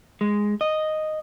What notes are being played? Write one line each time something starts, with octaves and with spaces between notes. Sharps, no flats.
G#3
D#5